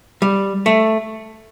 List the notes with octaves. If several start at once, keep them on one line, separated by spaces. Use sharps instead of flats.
G3
A3